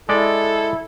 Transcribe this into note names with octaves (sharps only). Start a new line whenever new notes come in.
G#3 E4 A4 D5